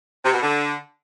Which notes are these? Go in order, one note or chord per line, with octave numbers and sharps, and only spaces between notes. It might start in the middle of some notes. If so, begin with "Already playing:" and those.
C3
B2
D3